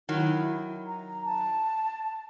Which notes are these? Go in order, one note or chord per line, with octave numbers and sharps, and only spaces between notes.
D#3 F#3 E4
A#5
A5